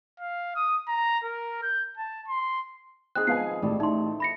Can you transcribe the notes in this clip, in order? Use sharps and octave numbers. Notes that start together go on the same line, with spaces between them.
F5
D#6
A#5
A#4
G6
A5
C6
C4 D#4 G#4 F#6
F3 B3 F5 G#5 C7
A1 G3 C4 A4
A3 D#4 C6
B5 A#6 C#7